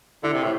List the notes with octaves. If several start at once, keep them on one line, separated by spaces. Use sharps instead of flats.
D3 E4
C3
A2